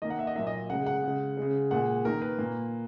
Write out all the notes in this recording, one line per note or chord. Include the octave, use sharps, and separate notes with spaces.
D#3 A#3 D#5
F#5
E5
D#5
A#2 F#3 A#3 E5
D#5
C#3 G#3 F#5
F#5
C#3 G#3
C#3 G#3
A#2 G#3 F#5
D#3 A#3 A#4
B4
A#2 A#3